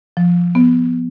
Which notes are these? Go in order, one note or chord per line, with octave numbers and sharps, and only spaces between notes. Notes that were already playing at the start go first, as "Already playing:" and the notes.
F3
B3